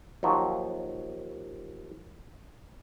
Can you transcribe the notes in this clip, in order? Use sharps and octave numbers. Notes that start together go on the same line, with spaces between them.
D#2 F3 F#3